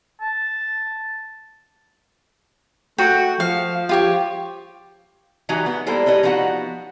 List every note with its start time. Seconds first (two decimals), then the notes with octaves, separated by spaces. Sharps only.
0.21 A5
2.98 A3 F#4 G5
3.40 F3 F5
3.89 F4 G4 C#5
5.49 E3 F#3 G#3 D#4 F#4 G4
5.66 B3
5.86 G3 G#3 A#3 E4 A4 C5
6.06 G4 B4 C#5 D#5
6.23 F3 B3 D#4 F#4 F#5